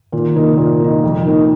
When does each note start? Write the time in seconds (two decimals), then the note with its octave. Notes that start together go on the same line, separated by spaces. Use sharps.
0.12 A#2 D#3
0.36 C3 A#3 D#4
0.57 A#2
0.80 A#3 D#4
1.04 F2
1.25 D#3 A#3 D#4